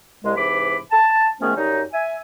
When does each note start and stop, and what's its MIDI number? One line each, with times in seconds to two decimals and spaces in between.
0.24 0.36 36
0.24 0.36 56
0.36 0.76 44
0.36 0.76 48
0.36 0.76 52
0.36 0.76 71
0.36 0.76 83
0.36 0.76 86
0.92 1.28 81
1.40 1.52 51
1.40 1.52 53
1.40 1.52 56
1.40 1.52 57
1.40 1.52 59
1.40 1.52 61
1.56 1.82 42
1.56 1.82 54
1.56 1.82 55
1.56 1.82 63
1.92 2.16 76
1.92 2.16 80